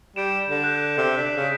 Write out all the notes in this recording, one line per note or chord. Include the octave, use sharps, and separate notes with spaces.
G3 G6 D7 E7
D3
F#6 G6
C3
D4 B6
C#3